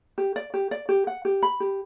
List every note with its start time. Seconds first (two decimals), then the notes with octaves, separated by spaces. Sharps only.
0.18 G4
0.36 D5
0.54 G4
0.71 D5
0.89 G4
1.07 F#5
1.25 G4
1.42 B5
1.60 G4